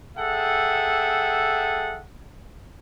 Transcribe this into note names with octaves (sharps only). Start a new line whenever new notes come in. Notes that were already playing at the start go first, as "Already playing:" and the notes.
G#4 A4 E5 F#5 G5